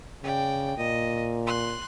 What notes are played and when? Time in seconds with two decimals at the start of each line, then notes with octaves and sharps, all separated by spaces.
0.23 C#3 D5 G5
0.77 A#2 D#5
1.47 C6 F#6